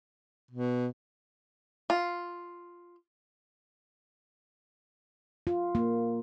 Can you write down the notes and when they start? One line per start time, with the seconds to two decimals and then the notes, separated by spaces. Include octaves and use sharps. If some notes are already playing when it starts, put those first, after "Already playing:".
0.51 B2
1.90 F4
5.47 F4
5.75 A#3